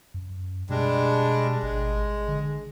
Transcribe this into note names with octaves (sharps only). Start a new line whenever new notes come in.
F#2
B2 G3 G#3 D4
G#1 G#3
D3